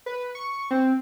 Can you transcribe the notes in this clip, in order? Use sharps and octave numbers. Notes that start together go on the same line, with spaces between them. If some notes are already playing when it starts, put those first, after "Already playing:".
B4
C#6
C4